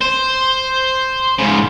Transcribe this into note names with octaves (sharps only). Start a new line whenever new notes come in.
C5
G#2 C#3